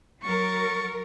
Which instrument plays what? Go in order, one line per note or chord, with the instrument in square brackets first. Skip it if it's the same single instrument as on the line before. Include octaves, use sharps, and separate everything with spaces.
[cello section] F#3 A#4 [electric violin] C#6 A6